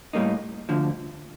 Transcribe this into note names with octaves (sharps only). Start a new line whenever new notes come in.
A2 G3 A#3 D#4
D2 D3 F3